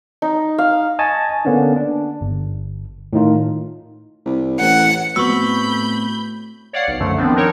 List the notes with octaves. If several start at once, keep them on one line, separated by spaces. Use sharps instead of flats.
D#4
F5
D#5 G#5 A5 C#6 A6
D3 A#3 B3 C#4 D4
D4
G1
A2 D#3 D#4 F4
C2
A1 F#5
A2 B3 C4 F#4 B5 C#6 E6 G6
C#5 D5 F5 F#5 C7
B1
F#2 D3 F3 A3
D#3 F3 B3 C4 D4
D4 D#4 A#4 C#5